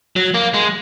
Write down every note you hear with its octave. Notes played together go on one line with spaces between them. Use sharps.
F#3
A#3
G#3